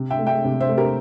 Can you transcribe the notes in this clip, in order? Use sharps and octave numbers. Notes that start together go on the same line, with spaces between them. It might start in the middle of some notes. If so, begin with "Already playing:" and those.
Already playing: C3
E5 G5
A3
E5 G5
C3
C5 E5
A3
G4 A#4